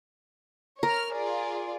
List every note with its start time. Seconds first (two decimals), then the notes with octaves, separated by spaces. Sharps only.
0.83 A#4 C#5 F6
1.14 F4 G#4 D5